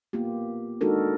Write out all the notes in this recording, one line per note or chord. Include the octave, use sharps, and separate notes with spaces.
A#3 B3 F4 G4
G#3 D4 D#4 F#4 A4 A#4